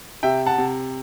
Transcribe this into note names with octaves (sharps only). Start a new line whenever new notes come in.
C3 E5 G5
F#5 A5
C3